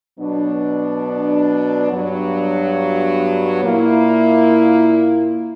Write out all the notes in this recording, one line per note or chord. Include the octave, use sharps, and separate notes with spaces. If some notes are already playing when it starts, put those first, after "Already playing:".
B2 F#3 B3 D4
G2 F#3 B3
A#2 A#3 E4